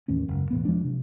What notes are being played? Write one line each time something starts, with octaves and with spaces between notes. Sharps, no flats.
A1 D#2 A2 C#4
F#1 C#2
E1 A1 F2 B3
F3 F#3 G#3 D4
C3